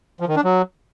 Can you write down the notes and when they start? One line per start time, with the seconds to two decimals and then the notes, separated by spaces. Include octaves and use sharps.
0.20 F3
0.28 D#3
0.36 D4
0.44 F#3